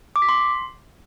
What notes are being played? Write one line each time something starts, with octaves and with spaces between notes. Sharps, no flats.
D6
B6
C6